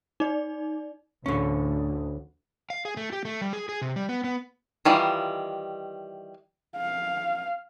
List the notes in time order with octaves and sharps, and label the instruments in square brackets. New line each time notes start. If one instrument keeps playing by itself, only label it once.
[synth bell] D#4 D5
[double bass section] D2 A2 [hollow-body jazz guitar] D3 C#4
[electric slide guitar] F5
G#4
A3
G4
A3
G3
G#4
G#4
C3
G3
B3
B3
[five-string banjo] D#3 E3 G3 F4
[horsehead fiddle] F5